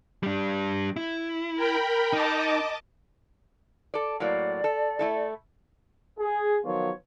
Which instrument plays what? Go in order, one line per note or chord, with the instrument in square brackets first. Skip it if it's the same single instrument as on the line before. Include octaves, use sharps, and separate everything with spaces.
[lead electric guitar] G3 D4
E4
[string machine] A#4 G5 B5
[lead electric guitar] D#4 [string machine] D#5 A5 D6
[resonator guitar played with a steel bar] A4 D5
[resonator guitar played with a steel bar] A2 F#3 A#3 [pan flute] D5
[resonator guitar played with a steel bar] A4
A3 E4 A4
[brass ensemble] G#4
D#3 F3 F#3 B3 F4 C#5